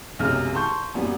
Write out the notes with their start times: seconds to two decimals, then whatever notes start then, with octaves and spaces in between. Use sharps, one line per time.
0.19 B1 F#2 C3 G#3 F6
0.55 A5 C6 C#6 G6
0.94 F#2 A#2 G3 B3